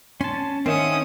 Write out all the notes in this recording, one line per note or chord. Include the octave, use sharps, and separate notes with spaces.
C#4 A5 C6
D#3 C4 C#4 E5 F#5 D#6